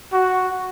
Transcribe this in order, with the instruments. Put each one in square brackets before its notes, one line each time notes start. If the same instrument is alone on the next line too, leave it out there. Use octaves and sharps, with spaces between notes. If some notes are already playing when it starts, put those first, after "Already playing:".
[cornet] F#4